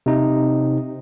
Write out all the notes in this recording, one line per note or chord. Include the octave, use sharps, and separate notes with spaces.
C3 D#4